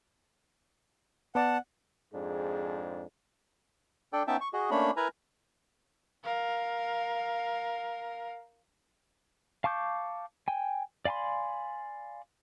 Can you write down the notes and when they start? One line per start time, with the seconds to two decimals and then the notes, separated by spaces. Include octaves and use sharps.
1.35 B3 D5 F#5 A5
2.14 F2 G#2 D4 G#4
4.13 D4 A4 D5 G5
4.27 B3 C#4 D#4 E5 G5 A5
4.41 C#6
4.53 F#4 G#4 D#5
4.71 A3 A#3 C#4 D4 C#5 B5
4.97 E4 A#4 B4 G#5 A#5
6.24 A#4 F5
9.64 F5 A5 C#6 D6 G6
10.48 G5 G#5
11.05 D5 F5 G#5 B5 C6